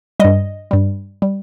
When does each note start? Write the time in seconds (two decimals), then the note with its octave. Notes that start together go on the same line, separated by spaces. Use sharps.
0.20 G2 G3 D#5
0.71 G2 G3
1.22 G3